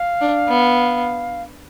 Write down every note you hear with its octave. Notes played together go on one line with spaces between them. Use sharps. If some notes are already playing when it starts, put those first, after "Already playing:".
Already playing: F5
D4
B3